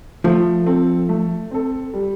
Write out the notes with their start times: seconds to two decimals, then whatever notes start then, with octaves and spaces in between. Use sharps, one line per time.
0.24 F3 A3
0.66 C4 A4
1.09 A3
1.51 C4 A4
1.94 G3